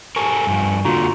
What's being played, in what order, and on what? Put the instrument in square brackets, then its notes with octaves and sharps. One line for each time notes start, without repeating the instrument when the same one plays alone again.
[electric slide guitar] G4 A4 A#4 [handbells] G#5 C#6
[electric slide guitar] G2 F3
[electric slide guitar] A#2 D3 [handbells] F4 F#4 A#5